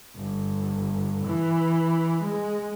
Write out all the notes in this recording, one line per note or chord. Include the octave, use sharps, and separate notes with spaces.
G1
E3
G#3